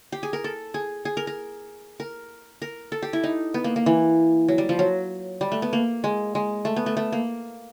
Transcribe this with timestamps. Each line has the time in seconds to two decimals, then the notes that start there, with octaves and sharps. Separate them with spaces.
0.12 G4
0.23 G#4
0.33 A#4
0.44 A4
0.74 G#4
1.05 G#4
1.17 A#4
1.27 A#4
2.00 A#4
2.62 A#4
2.92 A4
3.02 G4
3.13 E4
3.24 D#4
3.54 B3
3.64 A#3
3.76 A#3
3.86 E3
4.48 F#3
4.58 G3
4.69 F3
4.79 F#3
5.41 G3
5.52 A3
5.62 B3
5.73 A#3
6.04 G#3
6.35 G#3
6.65 A3
6.76 B3
6.86 A3
6.97 A3
7.12 A#3